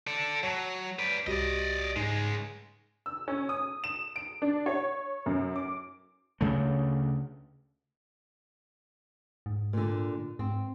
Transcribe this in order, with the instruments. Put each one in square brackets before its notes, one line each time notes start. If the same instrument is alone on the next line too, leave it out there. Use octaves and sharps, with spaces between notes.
[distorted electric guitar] A4 D5
[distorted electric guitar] F#3 [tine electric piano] C#5 A5
[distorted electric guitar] B4 D5
[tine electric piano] C2 F#4 G4 [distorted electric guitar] D5 D#5
[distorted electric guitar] C#2 G#3 [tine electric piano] G#2
[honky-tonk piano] E6
C#4
D#6
E7
D7
D4
C#5
F#2
D6
[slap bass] D2 C#3 A3
[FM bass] G#2
[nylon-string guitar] A#2 D3
[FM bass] G#2 [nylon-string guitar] C4